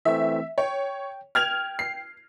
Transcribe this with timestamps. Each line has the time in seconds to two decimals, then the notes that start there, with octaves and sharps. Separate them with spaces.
0.05 E3 A3 C4 E5
0.58 C#5 G5
1.35 G5 F6 G#6 F7
1.79 C7